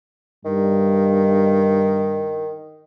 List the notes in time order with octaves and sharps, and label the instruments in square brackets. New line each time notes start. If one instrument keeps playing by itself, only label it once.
[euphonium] G2 [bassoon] D#3